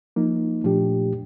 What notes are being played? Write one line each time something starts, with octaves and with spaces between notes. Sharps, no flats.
F3 A#3 D#4
A#2 F3 A3 D4 G4